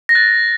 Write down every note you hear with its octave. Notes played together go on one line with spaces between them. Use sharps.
A#6
F#6 A6